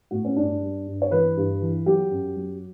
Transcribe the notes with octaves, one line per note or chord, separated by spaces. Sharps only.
A2 F#4
C#4
G2 D4
G3
G2
C#5
E3 B4
G2
E3
F#3 G4
F#2
F#3